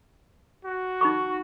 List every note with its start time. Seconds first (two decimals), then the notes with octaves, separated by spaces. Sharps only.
0.65 F#4
1.01 D#4 B5 C#6